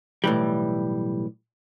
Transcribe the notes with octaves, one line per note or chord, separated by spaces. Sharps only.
B1 A2 E3 G3